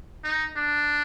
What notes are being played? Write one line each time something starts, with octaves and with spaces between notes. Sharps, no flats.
D#4
D4